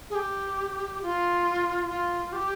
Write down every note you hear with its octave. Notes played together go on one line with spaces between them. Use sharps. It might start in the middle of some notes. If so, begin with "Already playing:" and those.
G#4
G4
F4
F4
G4